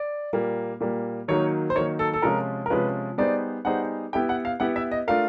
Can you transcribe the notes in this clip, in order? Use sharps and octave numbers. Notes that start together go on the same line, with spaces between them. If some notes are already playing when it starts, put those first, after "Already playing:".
Already playing: D5
A#2 G3 A#3
A#2 G3 A#3
D#3 F#3 A#3 D#4 C#5
C5
D#3 F#3 A#3 D#4 C#5
A4
A4
C3 F3 G#3 C#4 F4 A#4
A#4
C3 F3 G#3 C#4 F4 B4
G3 B3 D#4 G#4 C5 D5
G3 B3 D#4 G#4 C5 F#5
B3 E4 G4 G5
F#5
F5
B3 E4 G4 F#5
E5
D#5
A3 D4 F4 A#4 F5